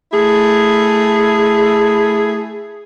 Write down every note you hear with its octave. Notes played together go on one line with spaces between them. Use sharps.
A3 E4 G#4